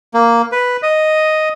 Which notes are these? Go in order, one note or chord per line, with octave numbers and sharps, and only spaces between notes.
A#3
B4
D#5